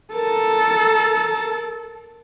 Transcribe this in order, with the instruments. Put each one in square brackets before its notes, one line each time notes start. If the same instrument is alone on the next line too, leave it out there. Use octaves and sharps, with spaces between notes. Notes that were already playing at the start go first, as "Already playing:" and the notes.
[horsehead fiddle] A4 [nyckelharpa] A#4 A5